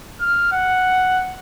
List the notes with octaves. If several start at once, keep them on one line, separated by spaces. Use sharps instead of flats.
F6
F#5